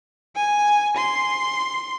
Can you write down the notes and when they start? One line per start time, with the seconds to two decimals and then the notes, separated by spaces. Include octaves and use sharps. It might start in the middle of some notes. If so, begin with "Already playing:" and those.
0.36 G#5
0.97 C6